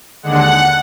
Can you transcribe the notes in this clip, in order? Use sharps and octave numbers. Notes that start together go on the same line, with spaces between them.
D#2 D3 G#3 D4 F#5